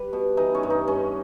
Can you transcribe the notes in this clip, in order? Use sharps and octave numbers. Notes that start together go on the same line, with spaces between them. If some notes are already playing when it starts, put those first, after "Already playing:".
Already playing: G3 B4
B2
E3 D#4
C#4
G2
D#4
G2 C#4